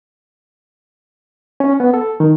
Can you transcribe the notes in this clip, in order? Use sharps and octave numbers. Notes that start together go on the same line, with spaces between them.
C#4
B3
A4
D#3